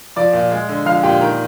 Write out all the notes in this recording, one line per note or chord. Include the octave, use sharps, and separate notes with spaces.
F3 D5 D6
A#2
G#3
D3
F3 F5 F6
A#2 G4 G5
D#3 A#4 A#5